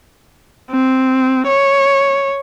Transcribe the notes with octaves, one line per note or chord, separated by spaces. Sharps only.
C4
C#5